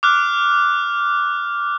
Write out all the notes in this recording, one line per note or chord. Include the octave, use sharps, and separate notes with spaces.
D6 F6 F#6